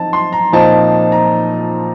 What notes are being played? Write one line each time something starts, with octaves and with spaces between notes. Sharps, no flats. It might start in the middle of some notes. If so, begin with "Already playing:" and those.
Already playing: F3 C4 D#4 A5
C6
A#5
A#2 F3 C4 D#4 A5
A#5